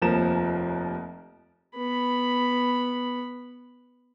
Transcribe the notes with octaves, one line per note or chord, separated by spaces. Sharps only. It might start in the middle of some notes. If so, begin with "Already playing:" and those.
F1 D#2 F3 A#4 E7
B3 B5